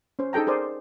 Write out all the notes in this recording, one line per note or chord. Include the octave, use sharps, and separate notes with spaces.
C#4 C5
D#4 G#4 A4 G5 A#5
G#4 A#4 C5 D5